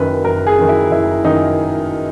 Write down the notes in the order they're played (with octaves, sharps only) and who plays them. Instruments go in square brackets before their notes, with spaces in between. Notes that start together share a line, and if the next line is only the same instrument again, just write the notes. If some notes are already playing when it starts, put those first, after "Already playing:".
Already playing: [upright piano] F#1 F#2 D#3 B4
F#1 A#4
G#4
F#2 D#3
E4
F#1 E4
F#2 D#3 D#4